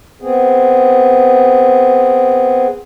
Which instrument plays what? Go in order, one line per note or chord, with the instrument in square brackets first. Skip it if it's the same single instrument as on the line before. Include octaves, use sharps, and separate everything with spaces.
[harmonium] B3 C4 G#4